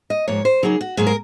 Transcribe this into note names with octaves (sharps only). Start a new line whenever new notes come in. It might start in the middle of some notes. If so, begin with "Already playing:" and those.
D#5
G#2 F3 A#3 C#5
C5
C#3 F#3 A#3 D#4 G#4
F#4
G#2 F#3 A#3 G#4
A#4